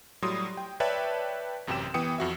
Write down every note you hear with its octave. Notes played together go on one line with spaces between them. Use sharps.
A2 F#3 G3 C6 D#6
G5
B4 C#5 D5 E5 G5 A5
A1 F#2 C3 G4 G5 E7
E3 B3 G5 D#6 C#7
F2 F#4 E5